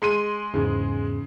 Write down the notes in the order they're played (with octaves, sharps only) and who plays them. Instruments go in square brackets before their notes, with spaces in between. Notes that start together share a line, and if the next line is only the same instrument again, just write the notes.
[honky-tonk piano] G#3 C6 D#7
[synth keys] E2 G#2 [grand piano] C#3